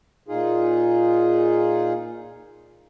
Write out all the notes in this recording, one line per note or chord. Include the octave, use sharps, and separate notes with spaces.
A#2 D#4 F4 G#4